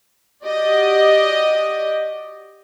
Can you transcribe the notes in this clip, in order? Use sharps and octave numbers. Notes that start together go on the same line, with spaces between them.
F#4 G4 D5 D#5